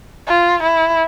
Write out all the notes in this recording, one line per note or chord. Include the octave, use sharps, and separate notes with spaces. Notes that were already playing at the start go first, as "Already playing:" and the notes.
F4
E4